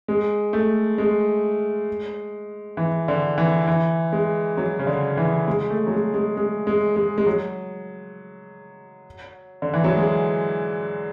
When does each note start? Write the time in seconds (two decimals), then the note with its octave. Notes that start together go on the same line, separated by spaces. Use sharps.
0.08 G#3
0.53 A3
0.98 G#3
2.77 E3
3.08 D3
3.38 E3
3.67 E3
4.12 G#3
4.57 F#3
4.79 C#3
4.87 D3
5.17 E3
5.48 G#3
5.70 A3
5.87 F#3
5.92 G#3
6.14 G#3
6.37 G#3
6.67 G#3
6.96 G#3
7.18 G#3
7.26 F#3
9.62 D3
9.74 E3
9.84 F#3
9.96 G#3